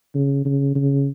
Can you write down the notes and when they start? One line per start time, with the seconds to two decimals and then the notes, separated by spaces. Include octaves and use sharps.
0.15 C#3
0.45 C#3
0.75 C#3